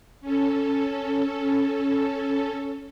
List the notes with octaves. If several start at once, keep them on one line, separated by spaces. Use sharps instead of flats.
C#4 A4